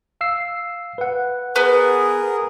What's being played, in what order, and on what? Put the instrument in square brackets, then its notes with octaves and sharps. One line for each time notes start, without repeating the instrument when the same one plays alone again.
[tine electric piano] F5 E6 C7
B4 F#5
[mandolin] B3 [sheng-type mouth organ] G#4 A#4